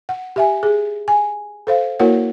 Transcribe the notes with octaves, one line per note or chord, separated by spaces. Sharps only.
F#5
G4 E5 G#5
G#4
G#5
A4 C5 F5
A#3 E4 F#4 A#4 C#5 F#5